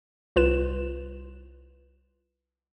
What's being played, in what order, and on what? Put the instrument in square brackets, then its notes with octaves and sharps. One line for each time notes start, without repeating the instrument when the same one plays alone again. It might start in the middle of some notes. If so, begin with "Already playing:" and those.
[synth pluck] C2 F4 B4 E7